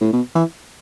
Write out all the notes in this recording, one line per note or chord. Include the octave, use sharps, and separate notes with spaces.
A2
B2
E3